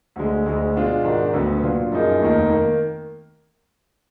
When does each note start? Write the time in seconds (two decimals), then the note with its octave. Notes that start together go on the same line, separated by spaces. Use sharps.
0.16 D2 D3 G#3
0.46 D2 D3 G#3
0.75 B2 G#3 D4 F4
1.04 G#2 D#3 G#3 D4 F#4
1.33 D2 D3 F#3 B3
1.62 A#2 F#3 D4 F4
1.92 F#2 F3 A#3 D#4 G#4
2.21 F1 D#2 D#3 A#3 D#4
2.50 D#3 A#3